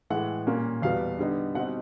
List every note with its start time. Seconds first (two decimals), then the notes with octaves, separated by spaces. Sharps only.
0.10 A2 E3 G#3 F#5
0.47 A#2 G3 A#3 C#4
0.82 E2 B2 G3 B3 F5
1.19 D3 G3 B3 D#4
1.55 B2 G3 C4 D#4 F#5